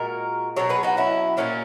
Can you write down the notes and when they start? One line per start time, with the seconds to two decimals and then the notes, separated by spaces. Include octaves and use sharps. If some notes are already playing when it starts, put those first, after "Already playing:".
Already playing: A#2 G#3 F#4 A#4
0.56 B2 F#3 A#4 C#5
0.69 G#4 B4
0.83 D#4 F#4
0.97 C#4 E4
1.37 A#2 F#3 A#3 C#4